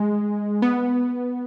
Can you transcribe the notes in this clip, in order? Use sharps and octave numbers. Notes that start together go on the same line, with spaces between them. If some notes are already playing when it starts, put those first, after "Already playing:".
Already playing: G#3
B3